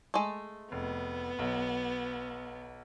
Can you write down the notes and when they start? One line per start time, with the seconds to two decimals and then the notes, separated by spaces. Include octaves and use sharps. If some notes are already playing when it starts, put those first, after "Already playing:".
0.14 G#3 A3
0.72 F1 B3
1.39 B1